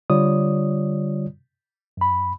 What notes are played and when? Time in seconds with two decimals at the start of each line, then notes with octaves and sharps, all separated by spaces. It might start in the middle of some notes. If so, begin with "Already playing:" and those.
0.10 D3 G3 F4 C#5 D5 D#6
1.97 F#2 B5